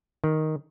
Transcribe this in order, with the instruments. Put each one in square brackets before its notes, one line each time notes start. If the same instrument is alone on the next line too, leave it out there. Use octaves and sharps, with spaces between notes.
[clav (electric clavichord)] D#3